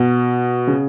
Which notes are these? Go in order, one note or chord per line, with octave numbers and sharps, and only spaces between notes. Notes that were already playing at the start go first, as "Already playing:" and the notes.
Already playing: B2
C#3